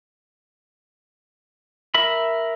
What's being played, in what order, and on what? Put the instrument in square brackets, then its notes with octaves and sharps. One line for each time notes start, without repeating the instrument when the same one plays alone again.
[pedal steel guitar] A#4 E5 B5